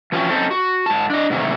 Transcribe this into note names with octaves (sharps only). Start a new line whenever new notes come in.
E3 F3 C#4 F#4 G5
C4 C#4 D#4 A4 C5
F#4
G#2 A5
D4 D#5
G#2 C3 D#3 E3 A3